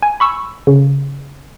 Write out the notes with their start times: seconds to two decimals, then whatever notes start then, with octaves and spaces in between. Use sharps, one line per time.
0.03 G#5
0.20 B5 C#6 E6
0.67 C#3